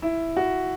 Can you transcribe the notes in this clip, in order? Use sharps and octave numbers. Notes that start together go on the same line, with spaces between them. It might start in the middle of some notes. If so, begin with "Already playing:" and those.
E4
F#4